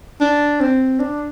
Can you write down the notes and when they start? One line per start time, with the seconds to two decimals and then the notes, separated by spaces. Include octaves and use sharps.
0.21 D4
0.61 C4
1.00 D4